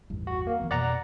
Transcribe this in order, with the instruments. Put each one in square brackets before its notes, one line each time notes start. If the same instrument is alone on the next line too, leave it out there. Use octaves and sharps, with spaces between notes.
[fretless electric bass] A1 E2 G2
[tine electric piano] F#4
A#3
[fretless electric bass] E3 F3 B3
[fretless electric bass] F2 B2 [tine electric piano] D5 F#5 A#5